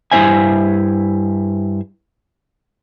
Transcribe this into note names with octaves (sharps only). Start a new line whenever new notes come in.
G2 C4 E4 C5 E5 G#5